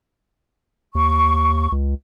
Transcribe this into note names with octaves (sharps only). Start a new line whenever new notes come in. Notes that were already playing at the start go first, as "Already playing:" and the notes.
D#2 C#6
C#2